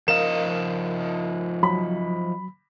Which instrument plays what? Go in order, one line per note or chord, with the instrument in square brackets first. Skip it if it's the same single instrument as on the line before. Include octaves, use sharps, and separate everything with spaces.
[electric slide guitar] F3 D#4 D#5 [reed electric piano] A#4 F5 [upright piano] E7
[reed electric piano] F#3 [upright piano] B5